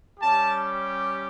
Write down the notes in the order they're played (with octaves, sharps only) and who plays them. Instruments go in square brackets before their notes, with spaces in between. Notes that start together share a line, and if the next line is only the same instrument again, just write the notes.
[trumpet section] G3 C#4 G4 A5